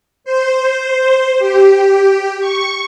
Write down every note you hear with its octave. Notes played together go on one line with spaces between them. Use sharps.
C5
G4
C#6